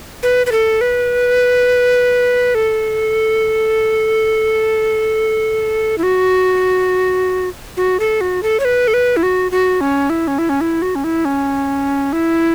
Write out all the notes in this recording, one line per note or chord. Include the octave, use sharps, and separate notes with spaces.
B4
B4
A4
B4
A4
E4
F#4
F#4
A4
F#4
A4
C#5
B4
A4
B4
E4
F#4
F#4
C#4
E4
C#4
E4
C#4
E4
F#4
C#4
E4
C#4
E4